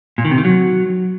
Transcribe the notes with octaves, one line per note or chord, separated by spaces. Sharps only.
A#2
D#3
C3
D#3
F#3